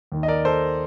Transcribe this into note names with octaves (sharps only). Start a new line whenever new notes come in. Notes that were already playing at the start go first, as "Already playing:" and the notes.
D#2 D#3
D#5
A#4 D5
A4 C5